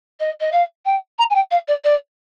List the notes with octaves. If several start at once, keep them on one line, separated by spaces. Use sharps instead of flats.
D#5
D#5
F5
G5
A#5
G#5
G5
F5
D5
D5